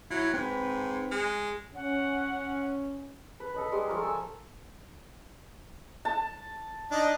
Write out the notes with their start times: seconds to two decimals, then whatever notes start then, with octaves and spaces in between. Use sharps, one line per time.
0.10 F#3 E4
0.34 G#2 C4 B4
1.11 G#3
1.75 C#4 F#5
3.40 B4
3.54 A4 D#5 B5
3.72 G3 G#3 C6
3.88 F3 A3 A#3 A#4
4.01 A4 G#5 E6
6.05 A5
6.91 D4 D#4 D#5